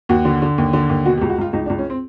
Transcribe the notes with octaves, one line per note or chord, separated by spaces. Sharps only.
D#2 F#4
D3
D3
D#2
D3
D#2
B2 F#4
G4
C#2
F#4
C#2 F4
C#2 D#4
D4
C#2
C#4
C4